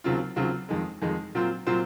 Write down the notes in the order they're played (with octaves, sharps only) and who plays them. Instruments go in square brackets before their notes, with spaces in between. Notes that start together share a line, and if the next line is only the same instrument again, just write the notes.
[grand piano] D#2 C#3 F#3 C4 F4
D#2 C#3 F#3 C4 F4
F2 D#3 G#3
F2 D#3 G#3
A#2 F#3 C4 F4 C5
A#2 F#3 C4 F4 C5